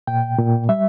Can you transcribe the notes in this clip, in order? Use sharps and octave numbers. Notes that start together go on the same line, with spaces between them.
A#2 G5
A#2
G3 E5